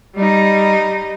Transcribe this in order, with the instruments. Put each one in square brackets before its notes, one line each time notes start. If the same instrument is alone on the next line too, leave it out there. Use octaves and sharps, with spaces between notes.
[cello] G3 D#4